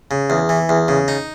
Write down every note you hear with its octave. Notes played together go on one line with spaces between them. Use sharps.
C#3
E2
E3
E2
C#3
D#4